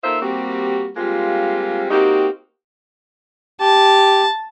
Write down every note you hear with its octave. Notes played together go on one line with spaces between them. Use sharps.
A#3 D#4 F4 A4 C5 E5
G3 A#3 C4 F#4 G4
G3 G#3 A#3 C4 F4
A#3 C4 D#4 F#4 G4
G4 A5